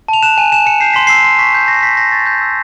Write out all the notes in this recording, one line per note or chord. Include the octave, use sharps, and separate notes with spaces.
A5 F7
F#6 E7
G#5 D#7
G#5 E7
G#5 C#7
G6 C7
C6 B6
E6 C7
C6
C#6 B6
G6
C#6 A#6
C7
C#6 B6
G6 A#6
C#6 A6
G6
E6